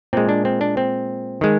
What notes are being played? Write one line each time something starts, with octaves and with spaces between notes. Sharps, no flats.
A#2 G#3 C4
D4
C4
D4
C4
D#3 G#3